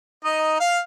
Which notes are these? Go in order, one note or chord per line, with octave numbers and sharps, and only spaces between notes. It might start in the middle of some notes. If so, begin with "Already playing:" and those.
D#4 D#5
F5 F6